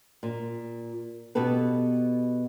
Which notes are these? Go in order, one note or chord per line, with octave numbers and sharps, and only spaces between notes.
A#2
B2 B3 G4 A4 B4